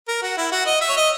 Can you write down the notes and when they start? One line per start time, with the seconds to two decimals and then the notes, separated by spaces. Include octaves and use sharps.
0.08 A#4
0.22 F#4
0.37 E4
0.52 F#4
0.66 D#5
0.81 E5
0.89 C#5
0.96 D#5